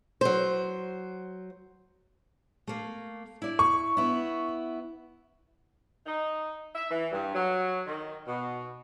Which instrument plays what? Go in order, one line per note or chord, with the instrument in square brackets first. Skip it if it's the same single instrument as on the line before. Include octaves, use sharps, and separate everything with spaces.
[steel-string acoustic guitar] F#3 C5
A3 A#3
E4 D5
[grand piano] C#6
[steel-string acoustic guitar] B3 E4
[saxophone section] D#4
E5
E3
G2
F#3
D#3
B2